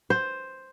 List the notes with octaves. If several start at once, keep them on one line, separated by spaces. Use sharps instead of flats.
C5